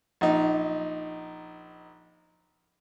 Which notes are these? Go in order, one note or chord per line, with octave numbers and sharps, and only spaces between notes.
A#1 D#4